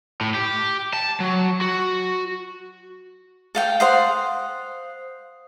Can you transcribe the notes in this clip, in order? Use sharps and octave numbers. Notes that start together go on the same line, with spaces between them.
A2
G4
A5
F#3
F#4
A4 F5 G5
C5 F5 F#5 C6 D#6 C7